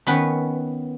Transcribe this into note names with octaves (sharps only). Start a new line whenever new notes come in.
D#3 B3 C#4 B4